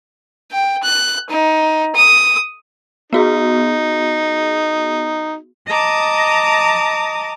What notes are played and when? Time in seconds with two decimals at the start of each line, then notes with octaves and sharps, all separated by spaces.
0.52 G5
0.83 F#6
1.30 D#4
1.95 D#6
3.13 B3 D#4 F#4 G#4
5.68 D#5 A5 A#5 D6 D#6